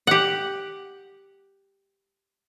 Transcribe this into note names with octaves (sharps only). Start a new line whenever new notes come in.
G4 F#5